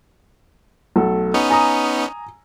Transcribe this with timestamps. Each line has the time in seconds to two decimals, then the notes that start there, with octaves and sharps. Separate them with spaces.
0.96 B1 A3 A4
1.34 B3 C#4 D#4
1.50 G#5 A#5 D#6